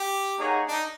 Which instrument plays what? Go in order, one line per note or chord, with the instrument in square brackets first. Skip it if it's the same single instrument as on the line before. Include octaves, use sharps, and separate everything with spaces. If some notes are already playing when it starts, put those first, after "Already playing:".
Already playing: [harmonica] G4
[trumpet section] A#3 D#4 G#4 C#5 F#5
[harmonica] D4
D#4